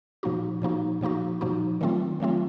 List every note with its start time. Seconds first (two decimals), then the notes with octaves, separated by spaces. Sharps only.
0.23 A#2 F3 A#3 D#4 F#4
0.62 A#2 F3 A#3 D#4 F#4
1.01 A#2 F3 A#3 D#4 F#4
1.41 A#2 F3 A#3 D#4 F#4
1.81 D#3 F#3 A3 C4 F4
2.20 D#3 F#3 A3 C4 F4